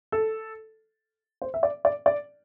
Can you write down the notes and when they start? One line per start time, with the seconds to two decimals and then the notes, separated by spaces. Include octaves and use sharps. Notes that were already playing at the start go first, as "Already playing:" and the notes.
0.12 A4
1.42 C5
1.54 E5
1.63 D5
1.85 D5
2.06 D5